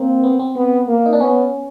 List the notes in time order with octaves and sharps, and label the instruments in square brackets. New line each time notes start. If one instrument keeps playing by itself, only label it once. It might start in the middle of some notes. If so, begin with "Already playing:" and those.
Already playing: [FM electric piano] A#3 [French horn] C4
[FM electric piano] B3
C4
[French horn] B3
A#3
[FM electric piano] D#4
D4
[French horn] B3 [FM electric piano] C#4